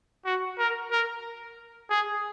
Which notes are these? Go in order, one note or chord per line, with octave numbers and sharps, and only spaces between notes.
F#4
A#4
A#4
G#4